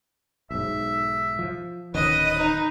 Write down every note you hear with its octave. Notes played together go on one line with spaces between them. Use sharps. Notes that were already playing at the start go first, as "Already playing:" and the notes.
B1 G#2 E5
F3
D1 D#3 C#4 B4 D#5 D#6
D#4